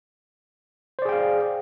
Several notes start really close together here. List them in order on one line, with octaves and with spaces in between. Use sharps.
C5 D5 G#4 G5 F5